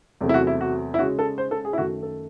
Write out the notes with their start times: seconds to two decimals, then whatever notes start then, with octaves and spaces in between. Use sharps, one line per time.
0.21 E2 C3 F#3 A3 C4
0.29 E4
0.34 F#4
0.47 E4
0.61 F#4
0.94 E4
0.99 C#3 G#3 C#4 F#4
1.19 A4
1.38 C5
1.51 A4
1.65 G#4
1.73 E4
1.78 F#2 D#3 A3 F#4
2.03 A4